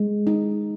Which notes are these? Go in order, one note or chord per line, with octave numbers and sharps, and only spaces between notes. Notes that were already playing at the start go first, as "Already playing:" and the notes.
Already playing: G#3
D#4